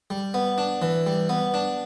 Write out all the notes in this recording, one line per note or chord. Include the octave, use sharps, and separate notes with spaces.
G3
B3
D4
E3
G3
B3
D4